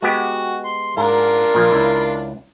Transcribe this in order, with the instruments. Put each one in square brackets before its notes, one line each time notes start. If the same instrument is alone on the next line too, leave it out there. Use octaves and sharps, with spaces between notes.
[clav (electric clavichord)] G#3 B3 G4 [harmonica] F#4
[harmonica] C6
[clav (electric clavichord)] G#2 [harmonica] D4 F4 A#4
[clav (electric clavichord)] A#2 F3
C#2 E4